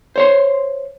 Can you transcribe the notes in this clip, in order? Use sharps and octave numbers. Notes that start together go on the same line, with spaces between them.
C5 C#5 C6